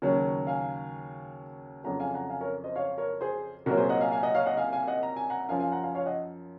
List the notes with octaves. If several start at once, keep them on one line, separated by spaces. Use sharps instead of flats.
D#2 C#3 F#3
F5 G#5
F2 C#3 F#3 F#5 A#5
F5 G#5
F#5 A#5
F5 G#5
A#4 C#5
C5 D#5
C#5 F5
A#4 C#5
G#4 C5
C2 A#2 F#3 F#4 A#4
G#4 C5
D#5 F#5
F5 G#5
F5 G#5
D#5 F#5
C#5 F5
D#5 F#5
F5 G#5
F5 G#5
D#5 F#5
A#5
G#5
F#5 A#5
F#2 F3 F5 G#5
F5 G#5
F#5 A#5
F5 G#5
C#5 F5
D#5 F#5